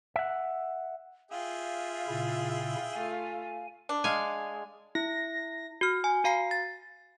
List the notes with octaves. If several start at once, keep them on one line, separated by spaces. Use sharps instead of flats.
E5 F#5
F4 G#4 E5 F5 G5
A#2 C#3 E4
A3 F4 G#5
D4
G#3 F5 G#5
E4 A#6
F#4 F6
G#5
F#4 F5 A#5 C7
A6